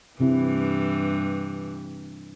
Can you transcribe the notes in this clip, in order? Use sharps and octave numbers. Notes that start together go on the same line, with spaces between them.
G2 C3 E3 C4 E4